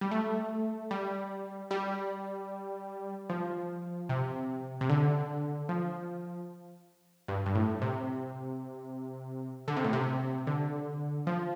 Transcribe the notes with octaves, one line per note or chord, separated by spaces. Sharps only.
G3
A3
G3
G3
F3
C3
C3
D3
F3
G2
G2
A2
C3
D3
C3
A2
C3
D3
F3